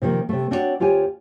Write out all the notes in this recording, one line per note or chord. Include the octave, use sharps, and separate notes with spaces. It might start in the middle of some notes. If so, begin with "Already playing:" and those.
C3 D#3 F3 A#3
C3 A3
C4 D4 F#4 A4 C#5
D2 F4 G4 C#5 G#5